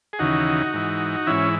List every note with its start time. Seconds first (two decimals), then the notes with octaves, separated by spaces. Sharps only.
0.13 G#4
0.19 D#2 C#3 E3 D#4 F#4
0.74 G#2 E3
1.27 G#2 E3 C#4 E4